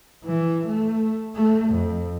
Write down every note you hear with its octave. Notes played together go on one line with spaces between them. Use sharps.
E3
A3
A3
F2